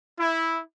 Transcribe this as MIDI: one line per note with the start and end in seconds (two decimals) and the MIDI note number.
0.19 0.60 64